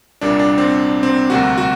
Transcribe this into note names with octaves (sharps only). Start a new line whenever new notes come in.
C2 A#2 G3 A#3 D4
D4
C4
C4
D2 C3 G3 A#3 F#4
F#4